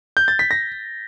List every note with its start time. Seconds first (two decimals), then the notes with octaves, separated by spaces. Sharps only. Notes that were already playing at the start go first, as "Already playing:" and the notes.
0.17 G6
0.28 A6
0.39 B6
0.51 A#6